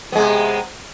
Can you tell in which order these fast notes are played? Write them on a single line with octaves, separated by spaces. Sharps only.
B3 G#3 C3